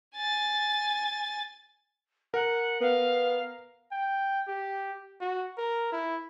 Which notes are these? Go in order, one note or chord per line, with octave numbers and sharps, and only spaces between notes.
G#5 A6
A#4 F#5
B3 F5
G5
G4
F#4
A#4
E4